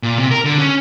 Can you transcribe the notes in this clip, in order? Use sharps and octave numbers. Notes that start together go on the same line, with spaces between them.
A#2
C3
A#4
D3
C#4